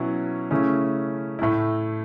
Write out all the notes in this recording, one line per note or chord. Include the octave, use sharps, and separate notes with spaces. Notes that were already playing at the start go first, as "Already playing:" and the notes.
Already playing: B2 F#3 C#4 E4
C#3 A3 C#4 E4
A2 A3 E4